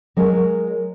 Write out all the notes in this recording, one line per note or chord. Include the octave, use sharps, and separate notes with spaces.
F#3 G#3 A#4 C#5